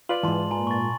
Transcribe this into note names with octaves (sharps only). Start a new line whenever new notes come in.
F4 B4 D5 F#7
F2 G#2 E3 A5 C6
A#2 G#5 A#5 C6
C#6 A6